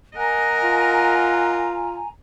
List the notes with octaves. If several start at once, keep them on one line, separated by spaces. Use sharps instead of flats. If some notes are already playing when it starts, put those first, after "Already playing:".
A#4 D#5 F#5 G#5 A#5
F4